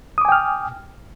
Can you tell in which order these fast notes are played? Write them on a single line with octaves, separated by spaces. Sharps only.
D#6 D6 G#5 G5 F6